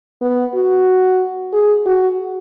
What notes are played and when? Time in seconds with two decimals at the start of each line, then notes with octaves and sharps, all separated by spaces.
0.22 B3
0.55 F#4
1.53 G#4
1.86 F#4